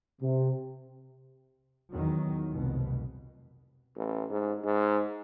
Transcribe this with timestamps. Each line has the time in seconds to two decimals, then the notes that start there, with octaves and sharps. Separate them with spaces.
0.21 C3
1.91 E2 D#3 F#3
2.52 F1 C2 B2
3.96 A1
4.30 G#2
4.64 G#2